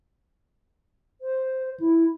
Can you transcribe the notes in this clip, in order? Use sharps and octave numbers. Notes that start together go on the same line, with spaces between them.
C5
E4